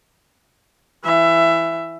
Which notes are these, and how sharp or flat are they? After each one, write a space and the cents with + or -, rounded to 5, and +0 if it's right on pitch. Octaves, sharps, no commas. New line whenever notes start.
E3 +10 E5 +20